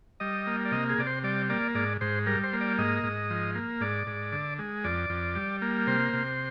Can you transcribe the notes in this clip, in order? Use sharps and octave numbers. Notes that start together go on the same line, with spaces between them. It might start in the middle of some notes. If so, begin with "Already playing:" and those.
G3 D#5
A#3
D5
C3 D#5
G#4
C3 D5
C5
G3 D5
A#3 D5
G#2 D5
G#2 C5
G3 A#4
C5
A#3
D5
G#2 D#5
G#2
F3
A#3
G#2 D5
G#2
D3
G#3
F2 D5
F2
G3
A#3
C3 C5
C3